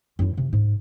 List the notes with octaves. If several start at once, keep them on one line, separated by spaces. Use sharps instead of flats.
F#2 E4
C3
G#2